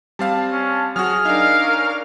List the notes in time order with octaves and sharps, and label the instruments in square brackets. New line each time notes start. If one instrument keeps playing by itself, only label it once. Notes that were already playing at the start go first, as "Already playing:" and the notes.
[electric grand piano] G3 C4 F5 [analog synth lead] A5
[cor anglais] C#4
[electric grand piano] F#3 F#4 [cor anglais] G#4 [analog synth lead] F6
[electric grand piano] D4 D#4 [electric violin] A#4 F5
[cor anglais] C#4